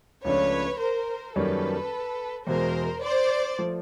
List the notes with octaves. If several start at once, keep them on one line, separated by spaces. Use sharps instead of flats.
C#2 C#3 F3 A3 D4 B4 C#5
A#4 C5
F#2 D#3 G3 A#3 C#4 A4 B4
E2 B2 G#3 A#4 C5
C5 D5
F3 A3